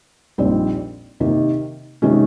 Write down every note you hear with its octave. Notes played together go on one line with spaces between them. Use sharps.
A#1 A#2 G3 C4 D#4
C3 D#3 A#3
C3 D#3 G#3 C#4